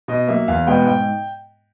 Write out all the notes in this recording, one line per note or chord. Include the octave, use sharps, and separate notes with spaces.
B2 D#5
F#3 A#3 E5
E2 F5
B2 G#3 B3 G5
G#2 G5